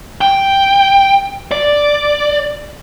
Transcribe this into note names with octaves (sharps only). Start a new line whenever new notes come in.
G5
D5